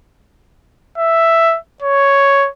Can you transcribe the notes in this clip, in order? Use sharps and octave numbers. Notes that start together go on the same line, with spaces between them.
E5
C#5